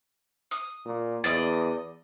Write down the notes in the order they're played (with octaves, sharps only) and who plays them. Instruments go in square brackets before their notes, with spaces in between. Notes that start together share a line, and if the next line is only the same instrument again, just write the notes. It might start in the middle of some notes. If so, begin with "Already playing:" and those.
[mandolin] D#6
[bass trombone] A#2
[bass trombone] E2 [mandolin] D5 D#5